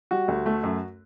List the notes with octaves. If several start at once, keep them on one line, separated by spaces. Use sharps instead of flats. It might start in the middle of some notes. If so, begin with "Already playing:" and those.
G3 F#4
D2
A3
F#2